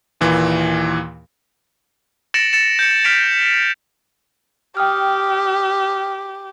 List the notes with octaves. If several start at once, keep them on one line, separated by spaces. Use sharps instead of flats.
D#2 A#2 E3
A6 A#6 C#7 D7 E7 F#7
A6 C#7 E7
G6 C#7
F6 A6 B6 D7 F7
G4 G5 D#6 F6